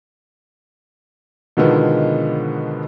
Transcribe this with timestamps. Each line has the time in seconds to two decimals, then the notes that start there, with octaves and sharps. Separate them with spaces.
1.57 B2 D3 D#3 F3 G#3 B3